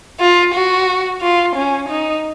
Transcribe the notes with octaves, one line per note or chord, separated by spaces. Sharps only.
F4
F#4
F4
C#4
D#4